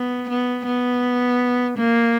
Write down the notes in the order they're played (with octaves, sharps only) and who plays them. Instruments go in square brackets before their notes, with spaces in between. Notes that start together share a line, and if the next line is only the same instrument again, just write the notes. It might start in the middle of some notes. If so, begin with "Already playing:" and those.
Already playing: [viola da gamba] B3
B3
B3
A#3